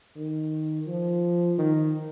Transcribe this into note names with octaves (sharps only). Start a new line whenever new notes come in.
D#3
F3
D#3